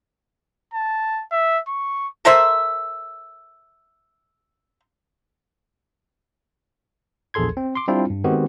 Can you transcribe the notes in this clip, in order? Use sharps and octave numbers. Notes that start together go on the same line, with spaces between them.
A5
E5
C#6
A4 A#4 C5 E5
A#1 E2 G#4 A4 C6 G#6
C4
C6 D6
G3 C4 D4 E4 F4
G2
D#3 G#3 B3 C4 F#4 G4